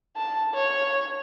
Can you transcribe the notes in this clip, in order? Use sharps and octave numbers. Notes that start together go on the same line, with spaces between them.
A5
C#5